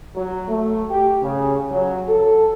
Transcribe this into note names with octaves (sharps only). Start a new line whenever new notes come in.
F#3
A3
G4
C#3
F#3
A4